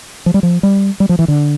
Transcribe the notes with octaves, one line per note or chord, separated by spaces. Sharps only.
F3
G3
F3
G3
G3
F3
E3
D3